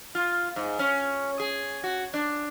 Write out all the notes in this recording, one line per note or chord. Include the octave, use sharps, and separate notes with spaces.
F4
G#2
C#4
G#4
F#4
D4